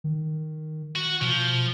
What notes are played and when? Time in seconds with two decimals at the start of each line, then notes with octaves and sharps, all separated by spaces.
0.04 D#3
0.95 F#4
1.21 B2 F3